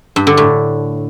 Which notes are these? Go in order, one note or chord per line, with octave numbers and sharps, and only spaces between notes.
G2
D3
A2